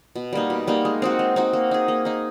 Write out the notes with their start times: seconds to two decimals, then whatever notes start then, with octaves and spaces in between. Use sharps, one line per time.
0.15 B2
0.33 G3 A#3 D#4
0.50 B2
0.67 G3 A#3 D#4
0.85 G#3
1.02 C4 D#4 F#4
1.19 G#3
1.36 C4 D#4 F#4
1.53 A#3
1.71 D#4 G#4
1.88 A#3
2.05 D#4 G#4